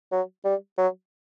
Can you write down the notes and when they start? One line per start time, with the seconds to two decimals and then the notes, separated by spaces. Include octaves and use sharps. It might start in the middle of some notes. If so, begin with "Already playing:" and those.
0.12 F#3
0.45 G3
0.78 F#3